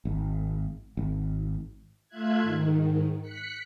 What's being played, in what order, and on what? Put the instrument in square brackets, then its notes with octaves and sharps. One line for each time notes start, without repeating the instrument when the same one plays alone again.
[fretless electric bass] G#1
G#1
[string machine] A3 F4 E5 F#6 G#6
G#2 D#3
F#6 B6 C#7